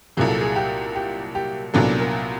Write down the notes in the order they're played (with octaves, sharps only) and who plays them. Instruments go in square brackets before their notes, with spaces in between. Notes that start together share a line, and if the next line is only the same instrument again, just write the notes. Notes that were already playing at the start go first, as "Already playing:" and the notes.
[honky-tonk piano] C2 A#2 F#3 [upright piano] G#4
[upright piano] A4
G#4
G4
G4
G4
[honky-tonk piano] C2 A#2 F#3 B3 D4 [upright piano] A4
[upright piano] A#4